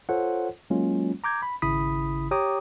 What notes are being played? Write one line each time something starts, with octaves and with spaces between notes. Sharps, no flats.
F4 A4 C5 C#5 F#5
F#3 G#3 A#3 C#4 F4
A#5 D6 G6 G#6
B5
G#1 C#3 E4 B5 D#6 B6
G4 C#5 G5 A#5 D6 D#6